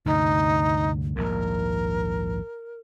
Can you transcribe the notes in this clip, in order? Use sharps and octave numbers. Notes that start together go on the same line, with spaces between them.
D2 G2 C3 D#4
A#1 D#2 G#2 A#4